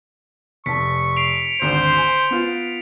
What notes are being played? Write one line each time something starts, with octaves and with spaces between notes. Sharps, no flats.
F1 A5 C#6 B6 C#7
C7 D7 F7
G#1 D2 C5
G#5
B3 F4